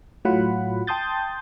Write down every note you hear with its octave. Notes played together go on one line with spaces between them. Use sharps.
A2 F#3 F4 F#5 B5
G5 A5 C6 D#6 G6 A6